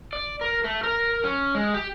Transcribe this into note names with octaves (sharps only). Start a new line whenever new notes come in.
D5
A#4
A3
A#4
C#4
G#3
G4